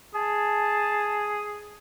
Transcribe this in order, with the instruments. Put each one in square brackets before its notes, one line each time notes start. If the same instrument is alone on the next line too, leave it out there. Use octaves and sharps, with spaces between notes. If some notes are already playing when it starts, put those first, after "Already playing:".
[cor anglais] G#4 [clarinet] A5